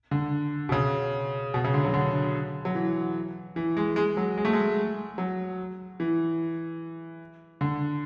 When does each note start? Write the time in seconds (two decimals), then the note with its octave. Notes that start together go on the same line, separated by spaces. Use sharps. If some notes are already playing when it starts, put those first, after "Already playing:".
0.11 D3
0.69 B2
0.72 C#3
1.54 B2
1.64 C#3
1.74 D3
1.85 F#3
1.94 D3
2.65 F#3
2.75 E3
3.56 E3
3.77 G#3
3.96 G#3
4.17 F#3
4.37 G#3
4.45 A3
4.53 G#3
5.18 F#3
6.00 E3
7.61 D3